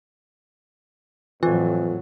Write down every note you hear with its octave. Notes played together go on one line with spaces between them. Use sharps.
F2 A2 E3 F#3 F4